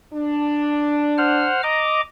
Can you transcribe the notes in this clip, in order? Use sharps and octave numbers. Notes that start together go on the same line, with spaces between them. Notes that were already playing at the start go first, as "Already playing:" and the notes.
D4
C5 F#5 F6
D#5 A#5 D6